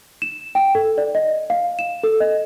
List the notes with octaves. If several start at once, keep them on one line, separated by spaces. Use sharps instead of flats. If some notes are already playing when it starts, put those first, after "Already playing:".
E7
G5
A4
D5
D#5
F5
E7
A4
D#5